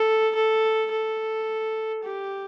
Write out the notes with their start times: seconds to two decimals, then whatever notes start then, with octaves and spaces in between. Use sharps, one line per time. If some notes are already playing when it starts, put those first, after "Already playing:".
Already playing: A4
0.35 A4
0.91 A4
2.04 G4